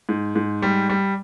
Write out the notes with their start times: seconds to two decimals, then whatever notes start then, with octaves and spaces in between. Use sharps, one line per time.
0.09 G#2
0.36 G#2
0.62 G3
0.89 G3